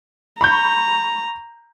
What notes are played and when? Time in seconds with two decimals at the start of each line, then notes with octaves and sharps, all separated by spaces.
0.41 A#5 B5 C#6 G6